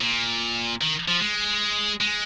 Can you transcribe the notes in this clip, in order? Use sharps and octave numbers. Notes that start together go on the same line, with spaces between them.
A#2
D#3
F3
G#3
G#3